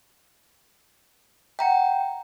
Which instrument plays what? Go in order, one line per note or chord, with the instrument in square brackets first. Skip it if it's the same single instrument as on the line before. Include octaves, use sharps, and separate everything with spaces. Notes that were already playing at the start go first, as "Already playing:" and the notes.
[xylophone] E5 F#5 [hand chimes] G5 A#5